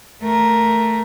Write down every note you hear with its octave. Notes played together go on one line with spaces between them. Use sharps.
A3 A#4